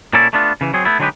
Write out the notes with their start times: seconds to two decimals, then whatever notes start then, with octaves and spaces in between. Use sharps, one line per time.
0.13 A#2 A#3 C#4 E4 A4 D5
0.33 A3 B3 D4 F4
0.61 C#3 E3
0.74 F#3 C4 G#4
0.85 A3 B3 E4
0.99 D3 F#3 G#3 D#4 G4 B4